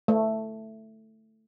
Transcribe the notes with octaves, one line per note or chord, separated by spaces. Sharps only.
A3